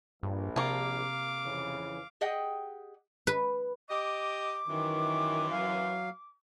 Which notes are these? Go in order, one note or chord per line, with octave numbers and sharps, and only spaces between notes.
A#1 G2
C3 A#3 F5 A5 D6
F2 C#3 E3
G4 G#4 D#5 F#5 G5
B4
G4 D#5 D6
F#2 D#3 E3
F#3 F5